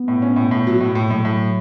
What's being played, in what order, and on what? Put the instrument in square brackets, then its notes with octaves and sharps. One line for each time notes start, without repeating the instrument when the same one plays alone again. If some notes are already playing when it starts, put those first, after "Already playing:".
Already playing: [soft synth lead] B3
[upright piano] A2
C#4
A2
A2
F#3
A2
[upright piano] A2 [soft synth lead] A3
[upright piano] A2 [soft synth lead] F#3
[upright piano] A2 [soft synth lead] F#3